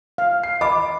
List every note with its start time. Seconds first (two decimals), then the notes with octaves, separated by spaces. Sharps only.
0.18 F5
0.43 C7
0.61 D#5 B5 D6